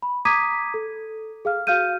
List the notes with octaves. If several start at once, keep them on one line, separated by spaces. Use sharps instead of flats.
B5
A#5 D6 D#6 G#6 B6 D#7
A4
G#4 F5 F6
F#4 F5 F6 G6 D#7